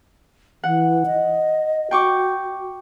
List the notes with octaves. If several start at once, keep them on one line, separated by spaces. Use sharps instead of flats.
E3 F#5
D#5
F#4 G5 C#6 D6